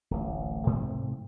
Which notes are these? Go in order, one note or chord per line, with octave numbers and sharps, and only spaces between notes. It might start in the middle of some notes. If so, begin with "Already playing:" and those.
D1 A1
G#2 C3 F3 A3